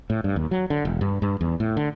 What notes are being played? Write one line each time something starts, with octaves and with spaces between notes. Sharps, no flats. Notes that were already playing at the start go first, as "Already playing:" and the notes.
A2
G2
D#2
F#3
D3
E1
G2
G2
E2
A2
D3